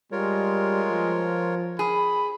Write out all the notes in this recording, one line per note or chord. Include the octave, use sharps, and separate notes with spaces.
G3 G#3 F4 A#4 C#5
F3
G#4 B5